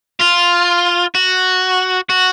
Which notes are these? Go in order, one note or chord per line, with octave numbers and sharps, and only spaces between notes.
F4
F#4
F#4